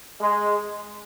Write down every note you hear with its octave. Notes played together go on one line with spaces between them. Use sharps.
G#3